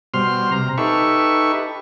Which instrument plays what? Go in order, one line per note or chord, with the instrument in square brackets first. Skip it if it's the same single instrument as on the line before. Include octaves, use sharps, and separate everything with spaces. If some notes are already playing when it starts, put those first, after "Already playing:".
[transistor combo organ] B2 G3 C5 C6 F6
C3 A#5
D#4 G4 A4 B4 E5 C#6